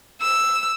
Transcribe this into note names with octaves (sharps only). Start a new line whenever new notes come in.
E6